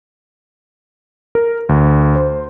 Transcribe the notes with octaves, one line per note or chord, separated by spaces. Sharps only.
A#4
D2
C5